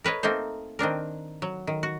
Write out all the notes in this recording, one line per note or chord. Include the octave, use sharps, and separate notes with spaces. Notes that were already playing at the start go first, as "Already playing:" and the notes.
A#4 B4 C#5 D#5
A3 A#3 C4 D#4 C5
D#3 C4 D4 A#4
F#3
D#3
F#4